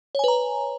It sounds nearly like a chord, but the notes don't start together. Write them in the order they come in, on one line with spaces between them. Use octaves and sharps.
C#5 G#5 B4 A#5